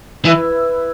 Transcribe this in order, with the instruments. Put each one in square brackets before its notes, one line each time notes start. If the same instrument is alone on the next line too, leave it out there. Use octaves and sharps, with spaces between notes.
[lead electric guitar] E3 [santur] E4 B4 E5